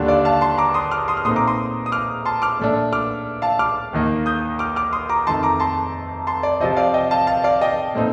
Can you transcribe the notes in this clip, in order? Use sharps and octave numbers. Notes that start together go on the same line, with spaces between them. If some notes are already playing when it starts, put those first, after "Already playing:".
Already playing: D#2 D3 G3 D4
D5 F5
F5 A5
A5 C6
A#5 D6
C6 D#6
D6 F6
C6 D#6
F6
A#2 A3 C4 D#4 C6 D#6
A#5 D6
C6 D#6
D#6
D6 F6
A5 C6
D6 F6
A#2 A3 D4
D6 F6
F5 A5
D6 F6
D#2 D#3 A#3 D#4
D#6 G6
D6 F6
D6 F6
C6 D#6
A#5 D6
F2 D#3 A3 D#4 A5 C6
A#5 D6
A5 C6
A5 C6
D5
C3 F3 C4 D#5
D5 F5
D#5 G5
F5 A5
F5 A5
D5 F5
D#5 G5
A#2 A3 C4 D#4